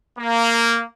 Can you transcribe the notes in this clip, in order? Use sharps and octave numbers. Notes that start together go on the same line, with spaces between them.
A#3